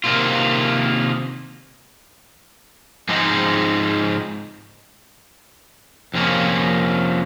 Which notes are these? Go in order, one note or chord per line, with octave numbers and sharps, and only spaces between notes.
C3 D#3 A#3 F4
G#2 F3 G#3 C4 D#4
F2 C3 F3 A#3 C#4